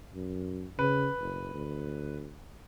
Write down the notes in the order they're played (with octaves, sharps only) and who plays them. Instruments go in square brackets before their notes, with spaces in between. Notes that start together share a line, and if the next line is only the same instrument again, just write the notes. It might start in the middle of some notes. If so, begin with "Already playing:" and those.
[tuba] F#2
[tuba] C#3 [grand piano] B4
[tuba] F#1
D2